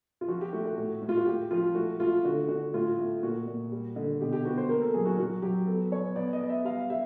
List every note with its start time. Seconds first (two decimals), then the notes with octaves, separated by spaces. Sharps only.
0.21 F4
0.28 F3 F#4
0.41 G4
0.53 A3 F#4
0.66 F#4
0.77 A2
1.02 A2
1.09 F4
1.17 F#4
1.26 A2 G4
1.51 F3 F4
1.75 A3 F#4
2.00 A3 F4
2.24 D3 F#4
2.48 D3 F#4
2.73 A2 F4
2.98 A3
3.22 A#2 F#4
3.47 A#2
3.72 G3
3.96 D3
4.21 B2 G4
4.33 G4
4.45 B3 F#4
4.57 C5
4.69 A#3 A#4
4.82 A4
4.94 F#3 G#4
5.05 F#4
5.18 F#3 F#4
5.42 F#3 G4
5.67 B3 A4
5.91 B3 C#5
6.16 B3 D5
6.33 D#5
6.41 B3
6.49 E5
6.65 G3 F5
6.90 G3 E5